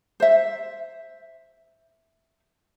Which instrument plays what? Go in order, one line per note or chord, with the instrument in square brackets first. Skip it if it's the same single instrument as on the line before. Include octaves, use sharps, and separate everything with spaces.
[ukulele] C5 E5